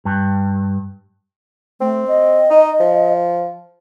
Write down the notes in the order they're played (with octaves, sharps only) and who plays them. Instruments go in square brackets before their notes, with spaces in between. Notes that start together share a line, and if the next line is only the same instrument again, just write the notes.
[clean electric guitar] G2
[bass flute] A3 [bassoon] C4
[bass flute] D#5
[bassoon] D#4
F3